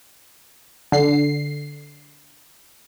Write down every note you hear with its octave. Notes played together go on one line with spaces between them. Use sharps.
D3 C7